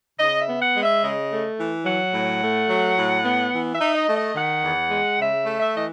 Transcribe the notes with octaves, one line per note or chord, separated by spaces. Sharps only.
C#3 D#5
E5
B3
F#5
G#3
E5
C#3 D#5
A3
E3
F#3 F#5
A2
A3
F#3
A2
B3
E3
E5
D#4
D#5
A3
D#5
D#3 F#5
E2
G#3
C#3 E5
A3
E5
E3 D#5